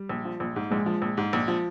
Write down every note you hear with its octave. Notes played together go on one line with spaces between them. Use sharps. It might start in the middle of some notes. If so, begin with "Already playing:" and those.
Already playing: G3
A#1
F3
A#1
G#2
A#1 G#3
F3
A#1
G#2
A#1
F3